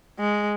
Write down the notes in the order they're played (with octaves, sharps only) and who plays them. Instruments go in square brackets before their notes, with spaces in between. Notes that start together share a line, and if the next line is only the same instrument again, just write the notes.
[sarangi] G#3